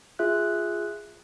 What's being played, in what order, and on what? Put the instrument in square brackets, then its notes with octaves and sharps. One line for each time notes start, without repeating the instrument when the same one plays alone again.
[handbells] F4 G#4 E5 F#6